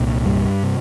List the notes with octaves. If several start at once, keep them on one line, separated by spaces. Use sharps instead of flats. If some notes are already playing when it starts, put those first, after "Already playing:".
Already playing: C2 A#2
G2 G3
C3